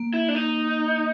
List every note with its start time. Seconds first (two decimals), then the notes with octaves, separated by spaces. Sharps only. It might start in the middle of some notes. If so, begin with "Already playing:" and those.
Already playing: A#3
0.14 E4
0.28 D4
0.35 D#4